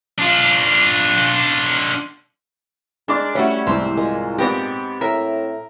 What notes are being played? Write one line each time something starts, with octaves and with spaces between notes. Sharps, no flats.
D4 F4
G#3 D4 A#4 D5
G3 A3 C#4 E4 F#4 C#5
C2 G#2 E3 C4 G4 C5
A#2 G#3
G#2 B3 C4 G4 D#5 A#5
A2 A#4 E5